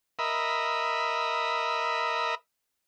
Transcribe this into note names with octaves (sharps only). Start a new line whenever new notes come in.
A#4 D#5 E5 B5